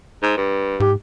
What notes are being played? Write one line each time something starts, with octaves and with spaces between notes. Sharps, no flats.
G#2
G2
G#2 G4